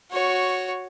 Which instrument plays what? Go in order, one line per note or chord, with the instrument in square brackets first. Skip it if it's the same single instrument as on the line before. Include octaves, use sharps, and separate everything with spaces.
[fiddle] F#4 C#5